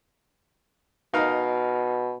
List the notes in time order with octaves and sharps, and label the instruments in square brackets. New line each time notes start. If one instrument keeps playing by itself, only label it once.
[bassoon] B2 [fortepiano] D#4 A#4 F5